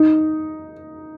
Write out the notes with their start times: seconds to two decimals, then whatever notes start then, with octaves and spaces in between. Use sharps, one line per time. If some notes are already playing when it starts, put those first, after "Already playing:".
Already playing: D#4